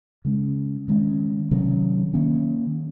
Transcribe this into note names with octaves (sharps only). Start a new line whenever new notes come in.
C#3 G#3 C#4
D#3 G#3 C#4
C3 D#3 F#3 C#4
D#3 A#3 C#4